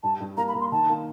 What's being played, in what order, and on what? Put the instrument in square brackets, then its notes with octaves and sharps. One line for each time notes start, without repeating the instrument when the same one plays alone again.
[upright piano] G2 [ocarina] A5
[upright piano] G2
[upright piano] A#3 [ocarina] A#5
[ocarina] B5
[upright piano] A#3
[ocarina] C6
[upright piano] D#3 [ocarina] A5
[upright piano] A#3